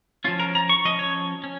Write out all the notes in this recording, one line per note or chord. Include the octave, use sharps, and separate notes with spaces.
F3 C#4 F4
A#4
A#5
C#6
F3 C#4 D#5
C#5
C#4